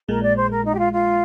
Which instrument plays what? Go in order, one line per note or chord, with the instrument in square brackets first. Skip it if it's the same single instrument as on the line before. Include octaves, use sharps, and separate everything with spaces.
[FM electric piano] A#1 A#2 G#3 [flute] A#4
[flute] D5
C5
A#4
D#4
G4
F4
F4